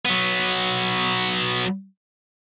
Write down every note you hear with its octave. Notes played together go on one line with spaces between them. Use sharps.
F#3 B3